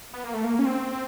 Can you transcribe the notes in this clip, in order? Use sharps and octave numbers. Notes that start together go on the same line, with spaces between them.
B3
A#3
A3
A#3
C#4
C4